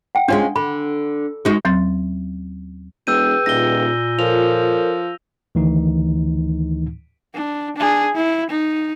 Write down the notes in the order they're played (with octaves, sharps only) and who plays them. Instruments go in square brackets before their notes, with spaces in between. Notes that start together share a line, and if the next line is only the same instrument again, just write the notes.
[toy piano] F#5 G5
[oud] G#3 C#4 F4 [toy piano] D4 G#5
[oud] D3 [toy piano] B5
[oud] G#3 D#4 F#4
[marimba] D#2 F#3 C4 C6 A6
[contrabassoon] E1 [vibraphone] G#4 B4 G5 [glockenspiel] E6 G6 D#7
[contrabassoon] D#1 [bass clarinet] A#2 [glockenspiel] A#6 G7
[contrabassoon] F3 [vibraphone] A4 A#4 C#5 [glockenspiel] F7
[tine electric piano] D2 D#3 E3 D#4
[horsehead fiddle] D4
D4 G#4
E4
D#4